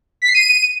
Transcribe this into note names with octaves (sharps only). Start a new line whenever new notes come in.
B6
C7
D#7